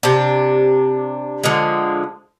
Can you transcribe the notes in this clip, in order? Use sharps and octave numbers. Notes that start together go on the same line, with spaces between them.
C3 D4
D3 F3 G#3